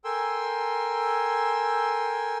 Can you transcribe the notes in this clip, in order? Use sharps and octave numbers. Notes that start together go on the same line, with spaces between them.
A4 A#4 G5 G#5 C6 E6